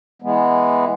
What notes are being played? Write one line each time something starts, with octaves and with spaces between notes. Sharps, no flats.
E3 G#3 B3